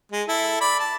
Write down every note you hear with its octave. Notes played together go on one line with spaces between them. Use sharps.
G#3
E4 A4
D5 B5
A5